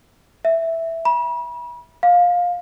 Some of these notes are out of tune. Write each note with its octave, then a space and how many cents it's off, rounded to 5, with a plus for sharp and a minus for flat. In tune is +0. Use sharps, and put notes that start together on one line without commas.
E5 +0
B5 -40
F5 +20